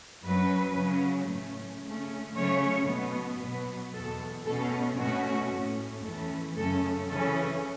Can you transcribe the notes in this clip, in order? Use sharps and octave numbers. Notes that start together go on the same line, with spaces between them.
F#2 F#3 C#4 B4
C#3 F#3 C#4
A2 A3 C#4
C#3 A3 C#4
C#3 F#3 A3 C#4 C#5
B2 B3
B2 F#3 B3 B4
E2 B2 B3 A4
B2 A3 C#4 A4
B2 A3 C#4 F#4
A2 A3 C#4
E2 E3 A3 C#4 A4
F#2 C#3 A3 C#4 A4
C#3 E3 C#4 A4